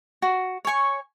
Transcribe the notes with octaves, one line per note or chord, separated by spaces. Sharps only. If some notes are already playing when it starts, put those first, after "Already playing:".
F#4
C#5 G#5 C#6